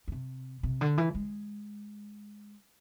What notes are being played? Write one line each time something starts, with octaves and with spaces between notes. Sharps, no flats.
D3
C3
C3
D3
E3
G#3